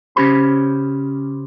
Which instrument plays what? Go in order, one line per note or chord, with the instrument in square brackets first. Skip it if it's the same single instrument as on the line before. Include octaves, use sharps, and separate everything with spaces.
[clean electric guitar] C#3 C#4 G4 C5 B5